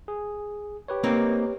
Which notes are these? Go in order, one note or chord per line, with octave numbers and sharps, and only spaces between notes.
G#4
G4 B4 C#5
A#3 C4 D#4